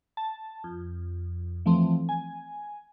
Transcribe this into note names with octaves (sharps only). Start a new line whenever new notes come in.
A5
F2
E3 F3 A3 C4
G#5